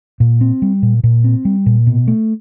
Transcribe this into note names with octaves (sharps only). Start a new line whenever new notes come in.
A#2
C4
G3
A#2
A#2
C4
G3
A#2
B2
A3